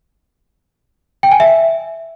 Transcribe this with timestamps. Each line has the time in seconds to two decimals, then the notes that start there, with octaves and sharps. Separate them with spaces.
1.23 G5
1.32 G#5
1.40 E5